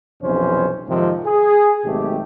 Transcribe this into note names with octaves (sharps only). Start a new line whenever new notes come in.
B1 F2 C3 E3 C#4 C5
F2 G#2 C3 D#3 F3
G#4
G#1 B2 F#3 A3 G4